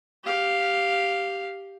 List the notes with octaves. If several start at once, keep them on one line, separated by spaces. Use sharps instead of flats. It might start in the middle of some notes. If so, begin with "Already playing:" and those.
G4 F5